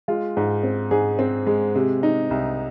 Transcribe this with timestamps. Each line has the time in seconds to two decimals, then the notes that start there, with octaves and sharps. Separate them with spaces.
0.08 G#3 F4
0.37 G#2
0.63 C4
0.91 G#2 G#4
1.19 C4
1.47 G#3
1.75 C3
2.03 D#4
2.31 C2